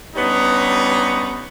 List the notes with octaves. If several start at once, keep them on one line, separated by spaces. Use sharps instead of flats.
G2 G3 B3 C#4 D#4